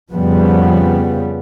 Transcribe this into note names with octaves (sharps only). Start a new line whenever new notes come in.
F2 C#3 F3 G3 B3